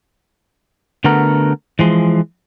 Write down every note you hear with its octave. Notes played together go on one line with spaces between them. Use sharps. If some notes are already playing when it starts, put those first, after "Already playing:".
D3 A3 B3 F#4 A#4
E3 F3 G#3